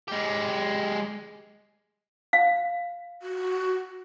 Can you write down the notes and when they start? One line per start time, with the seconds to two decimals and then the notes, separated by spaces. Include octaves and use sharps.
0.08 G#3 G4
2.33 F5
3.22 F#4